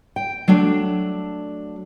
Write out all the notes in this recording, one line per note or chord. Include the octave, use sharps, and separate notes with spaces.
G5
F#3 A3 D4